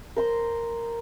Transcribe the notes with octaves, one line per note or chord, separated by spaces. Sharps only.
A#4 C5 A#5 C6